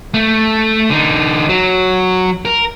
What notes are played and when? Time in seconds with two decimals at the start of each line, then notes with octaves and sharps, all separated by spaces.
0.14 A3
0.90 D3 D#4
1.49 F#3
2.45 A#4